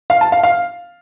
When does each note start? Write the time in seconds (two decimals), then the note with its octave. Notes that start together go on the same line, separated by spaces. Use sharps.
0.10 F5
0.21 A5
0.32 F5
0.43 F5